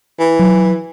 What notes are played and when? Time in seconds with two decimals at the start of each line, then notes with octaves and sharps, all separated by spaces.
0.20 E3
0.39 F#3